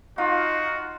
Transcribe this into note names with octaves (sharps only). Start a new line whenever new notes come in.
D#4 F4 F#4